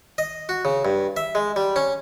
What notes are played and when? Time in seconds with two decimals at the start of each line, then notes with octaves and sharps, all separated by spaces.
0.18 D#5
0.49 F#4
0.65 C#3
0.85 G2
1.17 E5
1.35 G#3
1.56 G3
1.76 C#4